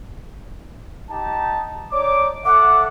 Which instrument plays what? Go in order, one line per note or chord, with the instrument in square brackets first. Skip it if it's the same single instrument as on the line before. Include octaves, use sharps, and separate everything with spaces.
[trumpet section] D#4 G4 A5
[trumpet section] D#4 D5 D6 [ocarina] C#5
[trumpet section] A4 E5 F#5 [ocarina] D6